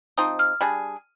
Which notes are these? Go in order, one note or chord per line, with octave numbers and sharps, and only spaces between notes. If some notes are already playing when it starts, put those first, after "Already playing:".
F3 C4 D#4 D#6
F6
G3 D4 G#4